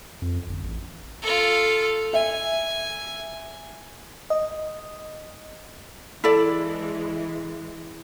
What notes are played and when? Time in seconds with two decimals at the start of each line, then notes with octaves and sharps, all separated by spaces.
0.22 F2
0.47 G1
0.63 A1
1.22 F4 A4
2.13 E5 G#5
4.30 D#5
6.24 E3 G#3 E4 A4 D5